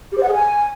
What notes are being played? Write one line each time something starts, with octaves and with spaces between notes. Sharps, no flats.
G4
C5
F#5
G#4
G#5